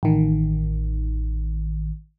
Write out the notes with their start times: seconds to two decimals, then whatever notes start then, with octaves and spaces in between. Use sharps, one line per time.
0.03 A1 D#3